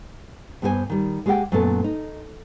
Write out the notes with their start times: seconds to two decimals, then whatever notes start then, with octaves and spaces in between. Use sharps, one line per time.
0.62 G2 B3 E4 G4 C5 G#5
0.90 D#3 G3
1.26 G#3 G4 G#4 D#5 F#5 G5
1.52 F#2 A#2 A3 B3 A4
1.84 D#4